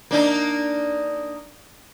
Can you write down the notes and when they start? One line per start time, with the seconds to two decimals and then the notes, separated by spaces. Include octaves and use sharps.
0.11 A#3 D4 D#4